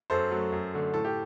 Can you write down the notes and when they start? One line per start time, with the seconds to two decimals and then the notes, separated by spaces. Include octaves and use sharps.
0.10 F#2 A4 C5
0.31 F#3 A3
0.52 F#2
0.74 D3 A3
0.94 A2 A4
1.05 G4